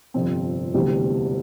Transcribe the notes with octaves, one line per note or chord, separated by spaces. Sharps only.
G1 F2 C3 F3 C4
E1 D2 C3 E3 G3